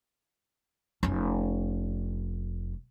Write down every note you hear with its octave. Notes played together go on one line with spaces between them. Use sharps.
F1 C#4